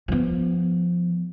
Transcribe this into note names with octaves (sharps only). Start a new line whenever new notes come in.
F3 B3